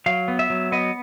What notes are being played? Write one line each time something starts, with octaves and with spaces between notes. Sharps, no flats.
F#3 F5
B3
E5
F#3
B3 D#5